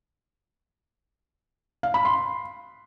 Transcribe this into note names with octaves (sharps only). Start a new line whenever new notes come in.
F5
B5
C6